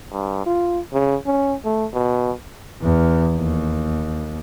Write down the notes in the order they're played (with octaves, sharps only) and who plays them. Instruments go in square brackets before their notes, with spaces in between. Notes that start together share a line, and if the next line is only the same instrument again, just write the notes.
[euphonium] G2
F4
C#3
C#4
A3
B2
[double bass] E2
D#2